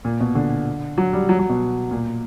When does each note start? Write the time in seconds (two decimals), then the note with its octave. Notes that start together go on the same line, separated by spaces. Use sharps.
0.05 A#2
0.20 B2
0.35 D3
0.98 F#3
1.13 G3
1.29 F#3
1.39 F#3
1.49 B2
1.91 A#2